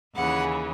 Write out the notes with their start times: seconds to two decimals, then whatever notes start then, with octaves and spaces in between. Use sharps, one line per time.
0.14 D#2 C#3 E3 F#5